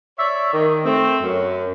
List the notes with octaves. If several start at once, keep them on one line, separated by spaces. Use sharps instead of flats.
C#5 D5 E5
D#3
A3 C4
F#2